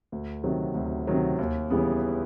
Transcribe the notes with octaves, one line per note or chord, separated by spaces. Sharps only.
D2
C3 D#3 F#3
D2
C3 D#3 F#3
D#2
C#3 E3 G3 B3